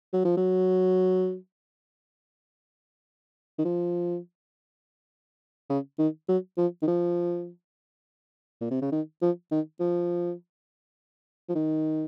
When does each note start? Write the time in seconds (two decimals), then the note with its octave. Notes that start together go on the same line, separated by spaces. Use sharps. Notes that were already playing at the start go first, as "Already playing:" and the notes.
0.13 F#3
0.25 F3
0.37 F#3
3.59 D#3
3.65 F3
5.70 C#3
5.99 D#3
6.29 F#3
6.58 F3
6.82 D#3
6.87 F3
8.61 A#2
8.71 C3
8.82 C#3
8.92 D#3
9.22 F3
9.51 D#3
9.80 F3
11.49 F3
11.55 D#3